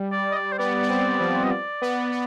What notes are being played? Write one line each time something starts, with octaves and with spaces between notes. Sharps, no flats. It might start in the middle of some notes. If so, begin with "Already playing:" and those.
Already playing: G3
D5
D#5
D5
C5
B3 D5
B3
C4
F3
D#5
D5
B3
B3